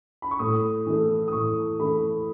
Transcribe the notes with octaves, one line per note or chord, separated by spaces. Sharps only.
B5
C#6
A2 D#6
E3 A3
D#6
A2 C#6
E3 A3 B5